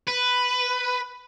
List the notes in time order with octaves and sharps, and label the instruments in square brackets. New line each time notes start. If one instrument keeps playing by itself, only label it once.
[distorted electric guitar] B4